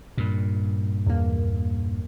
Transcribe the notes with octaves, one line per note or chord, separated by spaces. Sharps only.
G2 A#2
E2 A#3